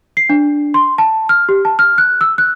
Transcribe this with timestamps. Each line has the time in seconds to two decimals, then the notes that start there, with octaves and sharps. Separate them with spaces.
0.17 C7
0.29 D4
0.74 C6
0.98 A5
1.29 F6
1.49 G4
1.65 A5
1.79 F6
1.98 F#6
2.21 E6
2.38 F#6